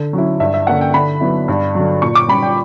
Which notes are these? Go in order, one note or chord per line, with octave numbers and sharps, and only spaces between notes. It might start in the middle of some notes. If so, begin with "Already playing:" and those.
Already playing: D3
F#3 C#4 E4
G2 E5
E5
D3 A#3 C#4 F#5
G5
D3 B5
F#3 B3 E4
G2
D3 F#3
A#2 C#6
D6
G3 C#4 B5
G5